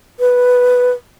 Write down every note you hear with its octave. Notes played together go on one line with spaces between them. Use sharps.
B4